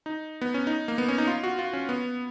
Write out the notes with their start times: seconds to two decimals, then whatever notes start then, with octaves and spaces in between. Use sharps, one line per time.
0.06 D#4
0.41 B3
0.54 C#4
0.67 D#4
0.88 A#3
0.98 B3
1.08 C#4
1.18 D#4
1.27 F4
1.43 F#4
1.59 F4
1.73 C#4
1.89 B3